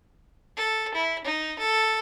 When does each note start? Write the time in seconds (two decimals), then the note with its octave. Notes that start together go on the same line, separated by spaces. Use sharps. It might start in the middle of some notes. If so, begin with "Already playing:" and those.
0.57 A4
0.94 E4
1.24 D#4
1.59 A4